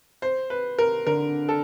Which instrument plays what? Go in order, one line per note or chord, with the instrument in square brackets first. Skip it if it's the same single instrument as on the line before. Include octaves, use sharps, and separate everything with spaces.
[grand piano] C5
B4
A#4
[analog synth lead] D3 [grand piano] A#4
[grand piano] A4